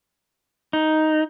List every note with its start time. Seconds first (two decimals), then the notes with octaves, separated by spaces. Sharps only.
0.73 D#4